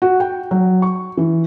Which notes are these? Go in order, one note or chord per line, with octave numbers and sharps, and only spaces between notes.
F#4
G5
F#3
C#6
E3